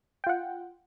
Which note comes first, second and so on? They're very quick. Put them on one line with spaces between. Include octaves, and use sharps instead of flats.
G5 F4 F#5